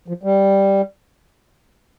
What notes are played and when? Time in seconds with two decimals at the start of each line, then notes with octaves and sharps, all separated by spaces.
0.08 F3
0.23 G3